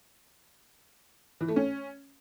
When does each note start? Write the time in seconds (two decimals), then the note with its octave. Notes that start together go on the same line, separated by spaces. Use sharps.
1.41 E3
1.48 A3
1.56 C#4